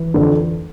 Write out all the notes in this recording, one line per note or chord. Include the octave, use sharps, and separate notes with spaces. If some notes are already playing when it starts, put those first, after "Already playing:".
Already playing: E3
F2 D3